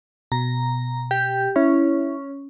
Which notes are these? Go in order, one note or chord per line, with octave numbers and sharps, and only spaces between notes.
B2 A#5
G4
C#4 E4